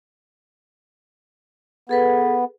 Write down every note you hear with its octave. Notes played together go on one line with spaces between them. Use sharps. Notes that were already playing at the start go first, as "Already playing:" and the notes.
B3 G#4 A4 B4